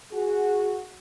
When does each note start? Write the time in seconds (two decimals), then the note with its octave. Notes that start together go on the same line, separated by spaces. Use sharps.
0.12 F#4 G#4